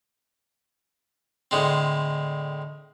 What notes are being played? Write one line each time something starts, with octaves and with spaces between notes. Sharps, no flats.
A2 D3 G#3 C4